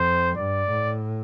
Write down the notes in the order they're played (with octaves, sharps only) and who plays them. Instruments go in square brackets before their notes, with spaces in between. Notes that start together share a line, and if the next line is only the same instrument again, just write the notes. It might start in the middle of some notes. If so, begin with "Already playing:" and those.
Already playing: [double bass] F2 [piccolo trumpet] C5
[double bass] G2 [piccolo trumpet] D5
[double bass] A2